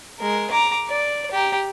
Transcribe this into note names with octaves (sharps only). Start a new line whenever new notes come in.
G#3 A#4
A#5 D6
D5
G4 A#5